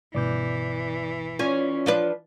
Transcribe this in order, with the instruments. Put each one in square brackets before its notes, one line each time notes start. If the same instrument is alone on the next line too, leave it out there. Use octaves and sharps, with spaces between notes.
[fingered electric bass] G1 B2 [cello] E3 [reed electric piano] D5 D6 G6
[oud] C#4 [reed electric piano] F4 C#5 D5
[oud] F3 D4 B4